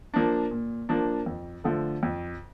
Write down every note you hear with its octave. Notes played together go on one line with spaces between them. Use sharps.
F3 A#3 D4
A#2
F3 A#3 D4
F2
D3 F3 A3
F2